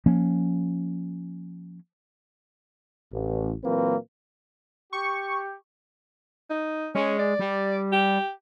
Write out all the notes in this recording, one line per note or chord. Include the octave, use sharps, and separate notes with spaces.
F3 A#3 C#4
A1
A#2 E3 F#3 A#3 C4 B4
G4 C#6
D#4
G#3 C#4
D5
G3
G4